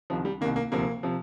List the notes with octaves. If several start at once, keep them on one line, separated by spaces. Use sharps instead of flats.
C2 C3 D#3 F3
G3
C2 C3 D#3 A#3
A#3
D2 C3 F3 A#3
C3 F3